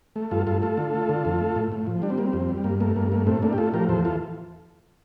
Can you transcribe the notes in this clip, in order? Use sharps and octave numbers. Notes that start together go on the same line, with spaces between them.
A3
G2 F4 A4
G2 F4 A4
A3 F4 A4
D3
A3
D3
F2
A3
A2
A2
F3
G3 D4
C4
G3 A#3
C4
F2
G3
G2 A#3
A3 A#3
G2 A#3
A3 A#3
A2 C4
A2 A#3 D4
G4
A2 F4 A4
F3 G4 A#4
E2 A4 C5
E3 F4 A4